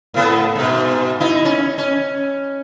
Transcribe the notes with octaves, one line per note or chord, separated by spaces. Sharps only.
A2 B3 A4
G#2 B2
D#4 E4
C#4
C#4